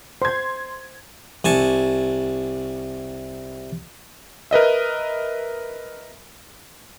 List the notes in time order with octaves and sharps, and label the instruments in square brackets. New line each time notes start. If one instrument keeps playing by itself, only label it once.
[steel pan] C5 [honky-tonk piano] C6 G#6
[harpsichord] C2 G#5 A5 C#6
[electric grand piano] A#4 B4 D#5 E5